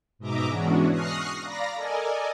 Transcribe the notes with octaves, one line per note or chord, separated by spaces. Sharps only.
G#2 B2 D#5 E5 A#5 D6
E3 G#3 B3 C#4 D4 F#4
C#6 D#6 F6 F#6 A#6 C7
D5 F5 A#5 B5 A#6
A4 A#4 D5 D#5 G#5